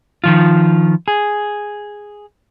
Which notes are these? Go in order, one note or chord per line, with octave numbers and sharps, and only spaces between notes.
D#3 F3 F4
G#4